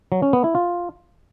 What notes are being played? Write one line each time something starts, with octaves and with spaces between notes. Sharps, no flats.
F#3
C#4
B3
E4
F4